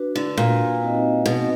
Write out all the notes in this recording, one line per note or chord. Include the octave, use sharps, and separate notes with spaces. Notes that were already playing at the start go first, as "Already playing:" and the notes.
Already playing: D4 F#4 B4
D3
A#2
C4 D#4 F#4 B4 D#5
B2